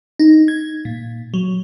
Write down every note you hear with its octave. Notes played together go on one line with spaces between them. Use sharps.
D#4
G#6
A#2
F#3